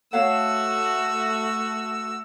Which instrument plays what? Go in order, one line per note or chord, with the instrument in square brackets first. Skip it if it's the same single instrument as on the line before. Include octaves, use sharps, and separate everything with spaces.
[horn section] A3 F#4 [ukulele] C#5 F5 F#5 [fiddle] E6